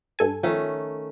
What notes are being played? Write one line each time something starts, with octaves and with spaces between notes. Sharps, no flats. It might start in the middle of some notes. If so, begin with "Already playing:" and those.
G2 A4 G#5
D#3 F3 A3 C#4